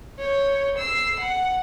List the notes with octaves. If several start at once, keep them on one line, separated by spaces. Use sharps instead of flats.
C#5 G6
E6 C7
F#5